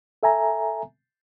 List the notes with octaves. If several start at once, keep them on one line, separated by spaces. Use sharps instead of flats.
A4 E5 G#5 A#5